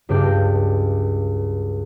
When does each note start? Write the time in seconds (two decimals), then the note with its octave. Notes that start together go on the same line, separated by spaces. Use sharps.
0.09 C#2 G2 G4 D5 G6 A#6